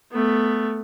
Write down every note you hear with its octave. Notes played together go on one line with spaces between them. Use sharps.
A3 B3